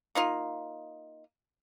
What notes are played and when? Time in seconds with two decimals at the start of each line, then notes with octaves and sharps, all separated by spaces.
0.15 A#3 D#4 F4